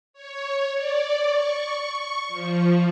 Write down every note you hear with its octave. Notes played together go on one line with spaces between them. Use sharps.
C#5
D5
C#6
F3